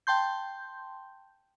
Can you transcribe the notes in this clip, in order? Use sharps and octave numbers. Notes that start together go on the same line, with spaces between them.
G5 A5 C6 G6